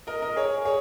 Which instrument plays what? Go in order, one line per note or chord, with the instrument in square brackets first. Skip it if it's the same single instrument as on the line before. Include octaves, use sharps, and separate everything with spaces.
[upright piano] A#4 D#5
A#4 D#5
G#4 C#5
G#4 C#5